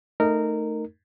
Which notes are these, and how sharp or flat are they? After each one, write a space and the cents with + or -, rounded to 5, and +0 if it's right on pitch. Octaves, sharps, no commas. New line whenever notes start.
A3 +0 D#4 -15 A#4 -15